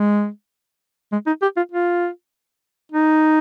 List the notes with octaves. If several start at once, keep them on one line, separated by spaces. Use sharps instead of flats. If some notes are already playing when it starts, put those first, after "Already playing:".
Already playing: G#3
G#3
D#4
G4
F4
F4
D#4